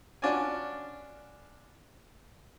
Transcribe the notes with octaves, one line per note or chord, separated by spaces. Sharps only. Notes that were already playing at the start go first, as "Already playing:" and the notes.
C#4 D4 F4 F#4 D5 G#5